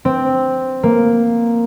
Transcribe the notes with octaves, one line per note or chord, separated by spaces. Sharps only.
C4
A#3